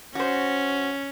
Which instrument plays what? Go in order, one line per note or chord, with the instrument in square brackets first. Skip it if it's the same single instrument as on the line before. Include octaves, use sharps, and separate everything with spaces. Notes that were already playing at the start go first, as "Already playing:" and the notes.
[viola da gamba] C#4 [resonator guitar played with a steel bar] F#4 C5